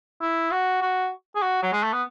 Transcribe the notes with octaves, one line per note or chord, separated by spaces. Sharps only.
E4
F#4
F#4
G#4
F#4
F#3
G#3
A3
B3